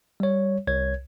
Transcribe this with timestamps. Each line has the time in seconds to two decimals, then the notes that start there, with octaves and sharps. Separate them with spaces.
0.20 G3 C#5
0.67 C2 C#5 G#6